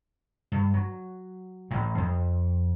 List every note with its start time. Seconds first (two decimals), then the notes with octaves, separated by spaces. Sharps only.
0.52 G2
0.74 F#3
1.71 A1 A2
1.98 F2